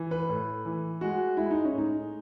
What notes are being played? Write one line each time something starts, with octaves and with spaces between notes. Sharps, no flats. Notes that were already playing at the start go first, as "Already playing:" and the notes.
Already playing: E3
B4
A2
E3
G#3 F#4
G#3 E4
D#4
C#4
A2
D#4